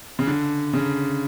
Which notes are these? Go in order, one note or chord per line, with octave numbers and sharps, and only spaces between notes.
C#3
D3
C#3